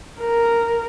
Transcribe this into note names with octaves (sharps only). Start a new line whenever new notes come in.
A#4